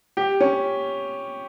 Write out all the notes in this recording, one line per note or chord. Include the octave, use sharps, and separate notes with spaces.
G4
C#4